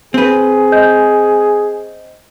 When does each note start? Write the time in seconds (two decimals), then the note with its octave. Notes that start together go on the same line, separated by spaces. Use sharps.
0.14 C4 G#4 B4
0.72 D#5 G6